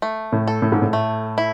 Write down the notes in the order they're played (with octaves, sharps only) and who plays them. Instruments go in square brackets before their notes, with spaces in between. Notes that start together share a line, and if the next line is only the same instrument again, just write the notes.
[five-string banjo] A3
[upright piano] A2
[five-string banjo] A4
[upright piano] A2
G#2
A2
[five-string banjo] A3
E4